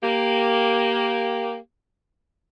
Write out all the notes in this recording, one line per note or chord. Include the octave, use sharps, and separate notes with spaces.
A#3 G4